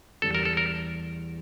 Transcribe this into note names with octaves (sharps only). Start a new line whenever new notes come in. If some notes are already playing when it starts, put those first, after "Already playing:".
E2 E3 G3 A4
A#4
A4
A#4